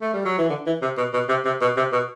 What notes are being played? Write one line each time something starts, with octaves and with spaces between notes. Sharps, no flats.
A3
G3
F#3
E3
D3
E3
C3
B2
B2
C3
C3
B2
C3
B2